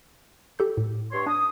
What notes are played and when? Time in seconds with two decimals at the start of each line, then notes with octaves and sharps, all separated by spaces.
0.59 G4 A4 G6
0.77 A2
1.12 G2 C#5 C6
1.26 D4 D#6